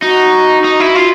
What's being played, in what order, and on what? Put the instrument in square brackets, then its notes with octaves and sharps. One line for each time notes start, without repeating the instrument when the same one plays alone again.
[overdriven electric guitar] D#4 [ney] F#4
[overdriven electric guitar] D#4
E4
F4